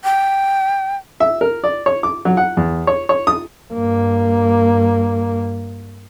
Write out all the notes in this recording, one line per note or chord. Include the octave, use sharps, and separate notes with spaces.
G5
E5
A#4
D5
C#5
D6
F#3
F#5
E2
C#5
C#5
D#6
G2 A#3